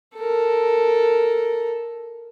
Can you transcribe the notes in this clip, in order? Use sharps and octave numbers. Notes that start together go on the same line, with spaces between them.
A4 A#4